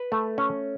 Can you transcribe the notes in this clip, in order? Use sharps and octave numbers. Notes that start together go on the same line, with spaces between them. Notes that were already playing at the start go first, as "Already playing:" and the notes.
Already playing: B4
A3
C#4